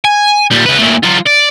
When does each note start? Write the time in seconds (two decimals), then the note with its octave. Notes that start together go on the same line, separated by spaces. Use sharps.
0.05 G#5
0.51 A#2 G3
0.66 C#3 B4
0.78 A#2 A3
1.04 F#3 F4
1.27 D5